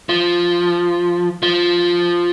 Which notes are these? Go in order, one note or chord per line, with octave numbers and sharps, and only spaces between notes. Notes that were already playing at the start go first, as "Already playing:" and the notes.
F3
F3